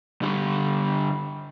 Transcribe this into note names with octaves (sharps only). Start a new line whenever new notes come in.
D3 G3